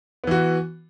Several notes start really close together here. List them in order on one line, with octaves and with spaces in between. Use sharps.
B3 E3 F#4